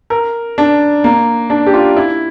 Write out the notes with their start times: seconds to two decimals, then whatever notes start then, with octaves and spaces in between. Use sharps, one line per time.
0.10 A#4
0.58 D4
1.04 A#3
1.50 D4
1.66 G4
1.74 F4
1.97 E4